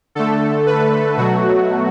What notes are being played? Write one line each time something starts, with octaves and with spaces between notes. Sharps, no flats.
D3 A3 A4
B4
B2 F#3 A3 F#4